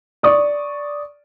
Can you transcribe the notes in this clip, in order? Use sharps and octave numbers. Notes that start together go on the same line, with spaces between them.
D5 C#6 D#6